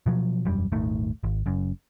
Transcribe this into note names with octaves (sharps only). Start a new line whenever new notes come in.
B2 F3 F#3
E1 F#2 G3
D#1 G#1 D#3 A3
G#1
F#1 F#2